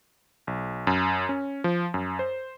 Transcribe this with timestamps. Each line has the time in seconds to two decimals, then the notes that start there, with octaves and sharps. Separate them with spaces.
0.47 B1
0.87 F#2
1.29 C#4
1.64 F3
1.94 F#2
2.19 C5